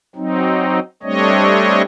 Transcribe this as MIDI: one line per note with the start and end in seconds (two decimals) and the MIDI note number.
0.16 0.79 54
0.16 0.79 60
0.16 0.79 63
1.03 1.82 55
1.03 1.82 57
1.03 1.82 60
1.03 1.82 62
1.03 1.82 73
1.03 1.82 75